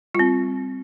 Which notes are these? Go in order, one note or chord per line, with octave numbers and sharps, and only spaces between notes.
G3 C4 F4